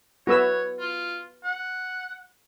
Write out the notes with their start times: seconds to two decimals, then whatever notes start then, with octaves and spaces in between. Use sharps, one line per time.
0.27 F#4 B4 C#5 E6
0.79 F4
1.44 F#5